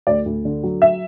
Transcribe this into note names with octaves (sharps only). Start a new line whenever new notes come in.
D2 D5
D2
D3
F#3
E5